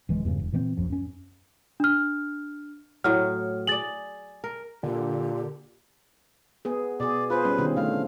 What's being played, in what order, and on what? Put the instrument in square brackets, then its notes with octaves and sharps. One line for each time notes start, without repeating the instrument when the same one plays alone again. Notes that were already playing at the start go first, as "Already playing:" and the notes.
[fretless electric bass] D1 E3 G#3
E2 G2 C#3
E1
A#2 E3 F#3 C4
A#1 F#2 F3
F#2 C#4
[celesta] D4 F6
[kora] A2 F#3 [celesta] F6
[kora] G#4 D5 [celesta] A6 F#7
[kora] A#4
[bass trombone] A#2 [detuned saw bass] D3 [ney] G4
[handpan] B3 G#4
[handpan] B2 G#4 [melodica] D5
[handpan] F4 G#4 C5 [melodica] B4
[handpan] G3 C#4
B2 D#3 C4
[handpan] D3 A3 [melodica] F5